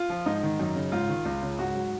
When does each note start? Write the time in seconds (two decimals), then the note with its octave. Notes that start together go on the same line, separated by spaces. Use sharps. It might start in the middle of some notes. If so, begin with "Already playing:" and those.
Already playing: F4
0.09 F3
0.26 G#2 D#4
0.43 D#3
0.59 F#2
0.76 C#3
0.92 G#2 F4
1.09 D#3
1.25 C#2
1.42 C#3
1.59 G#2 F#4
1.75 F#3